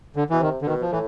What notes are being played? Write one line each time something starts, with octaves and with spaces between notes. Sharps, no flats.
D3
B2 E3
C3 D#3
D3
B2 D#3
F3
A2 E3